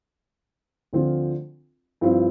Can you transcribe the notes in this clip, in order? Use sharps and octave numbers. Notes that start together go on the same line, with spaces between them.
D2 D3 F3 C4 F4
G2 F3 C4 E4